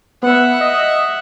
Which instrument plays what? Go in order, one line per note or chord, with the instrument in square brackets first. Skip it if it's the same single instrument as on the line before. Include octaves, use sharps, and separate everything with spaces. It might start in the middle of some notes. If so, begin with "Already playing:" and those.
[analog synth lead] B3 [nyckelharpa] E5 F#5
[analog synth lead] D#5